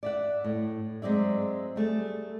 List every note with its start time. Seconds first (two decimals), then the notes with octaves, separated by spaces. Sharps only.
0.03 D5 E5 F#5
0.44 A2
1.02 F#3 G#3 C4 D5 E5
1.76 G3 A3 G#4